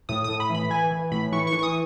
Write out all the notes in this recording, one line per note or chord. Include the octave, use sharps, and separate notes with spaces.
A2 D#6
A2 D#6
B5
E3
B5
E3 G#5
E3
A2 B5
E3 C#6
C#6
E3
C#6
D#6